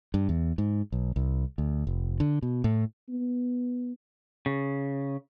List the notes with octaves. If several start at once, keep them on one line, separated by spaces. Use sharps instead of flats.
G2
E2
G#2
B1
C2
D2
F1
D3
B2
A2
B3
C#3